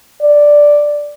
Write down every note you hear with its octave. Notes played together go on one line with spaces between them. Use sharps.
D5